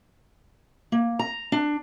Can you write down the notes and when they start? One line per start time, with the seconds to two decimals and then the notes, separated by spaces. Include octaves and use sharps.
0.92 A#3
1.19 A#5
1.52 D4